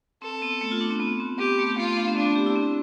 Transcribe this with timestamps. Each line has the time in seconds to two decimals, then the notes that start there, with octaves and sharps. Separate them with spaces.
0.22 C4 A4
0.42 B3
0.61 A3
0.72 F4
0.81 D4
0.91 C4
1.00 B3
1.20 C4
1.38 B3 G4
1.58 A3
1.77 A3 F4
1.87 B3
1.97 D4
2.07 C4
2.16 B3 D4
2.26 C4
2.36 G4
2.46 E4
2.56 C4